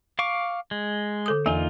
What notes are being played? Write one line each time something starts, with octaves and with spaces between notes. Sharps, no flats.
F5 C#6 D6
G#3
D3 A4 D#6
E2 E3 A#3 D#4 F4 G#5